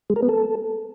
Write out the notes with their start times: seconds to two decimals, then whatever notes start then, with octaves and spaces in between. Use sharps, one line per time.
0.10 G#3
0.16 A#4
0.23 B3
0.29 A4